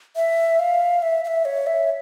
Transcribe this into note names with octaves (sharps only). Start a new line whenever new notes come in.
E5
F5
E5
F5
E5
C#5
E5